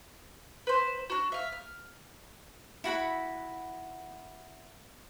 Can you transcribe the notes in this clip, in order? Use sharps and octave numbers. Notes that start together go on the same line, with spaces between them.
B4 C5
D4 F#4
E5 F5
F6
E4 F#4 F#5 B5